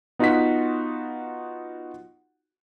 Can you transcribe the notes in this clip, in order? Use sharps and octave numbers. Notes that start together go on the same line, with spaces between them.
B3 D#4 F4 F#4 F#5 B6